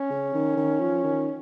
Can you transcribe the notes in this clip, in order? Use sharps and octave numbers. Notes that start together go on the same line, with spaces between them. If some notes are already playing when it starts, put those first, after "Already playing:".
Already playing: C#4
C#3
D#3
D#3
F3
D#3